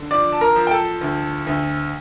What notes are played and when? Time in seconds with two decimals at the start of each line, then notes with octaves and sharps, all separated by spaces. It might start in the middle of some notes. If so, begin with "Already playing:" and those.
Already playing: D3
0.11 F3 D5 D6
0.32 A5
0.41 A#4 A#5
0.56 F3
0.67 G5
0.71 A4 A5
1.01 D2
1.47 D2